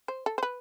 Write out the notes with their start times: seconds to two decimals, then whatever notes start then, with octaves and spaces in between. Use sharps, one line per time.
0.08 C5
0.26 A4
0.38 C5
0.43 B4